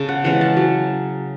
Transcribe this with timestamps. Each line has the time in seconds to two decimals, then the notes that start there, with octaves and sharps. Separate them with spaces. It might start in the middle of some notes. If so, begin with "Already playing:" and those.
Already playing: C#3 C#4 A5
0.09 F#5
0.24 E3 G#3 C#4 F#5
0.41 A5
0.57 F#3